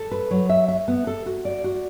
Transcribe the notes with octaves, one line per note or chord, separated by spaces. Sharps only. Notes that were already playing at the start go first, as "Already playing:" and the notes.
Already playing: A4
B4
F#3
E5
E5
B3
A4
F#4
D5
F#4